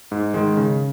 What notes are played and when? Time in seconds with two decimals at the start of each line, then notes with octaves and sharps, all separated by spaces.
0.12 G#2
0.34 D#3 G#3
0.57 C#3